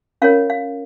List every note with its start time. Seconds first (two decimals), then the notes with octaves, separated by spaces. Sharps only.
0.22 C#4 F4 A#4 C#5 F5
0.50 F5